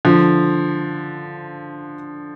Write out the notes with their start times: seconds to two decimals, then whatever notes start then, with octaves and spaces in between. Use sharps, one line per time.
0.05 D3 F3